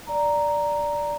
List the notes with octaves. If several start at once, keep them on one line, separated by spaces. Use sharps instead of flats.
D5 A#5